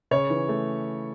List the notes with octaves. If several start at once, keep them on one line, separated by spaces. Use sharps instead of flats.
C#3 C#5
E3
A3